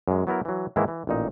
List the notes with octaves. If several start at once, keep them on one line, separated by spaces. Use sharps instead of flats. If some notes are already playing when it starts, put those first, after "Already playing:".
F#2 G#3
F#3 B3 E4 A#4
E3 F#3
G#2 D#3 E3 G#3 A#3 E4
E3
A1 A#2 D#4